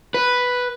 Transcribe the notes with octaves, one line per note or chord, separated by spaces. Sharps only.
B4